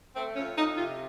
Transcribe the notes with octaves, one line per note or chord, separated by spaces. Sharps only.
A3 C4
F2 C#4
F2 D#4
C3 F4